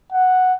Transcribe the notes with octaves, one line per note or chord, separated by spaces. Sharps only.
F#5